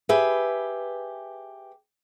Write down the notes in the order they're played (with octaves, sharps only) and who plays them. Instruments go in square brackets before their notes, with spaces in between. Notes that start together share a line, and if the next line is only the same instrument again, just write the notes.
[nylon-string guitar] G4 G#4 B4 E5